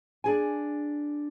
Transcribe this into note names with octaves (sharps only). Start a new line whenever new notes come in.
D4 G#4 G#5